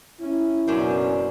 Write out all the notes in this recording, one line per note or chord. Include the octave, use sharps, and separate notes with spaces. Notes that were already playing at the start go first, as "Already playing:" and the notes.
C#4 E4
F#1 F#2 B2 C#4 D4 C5